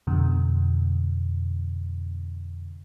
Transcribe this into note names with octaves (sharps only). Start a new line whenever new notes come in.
F2 B2 D3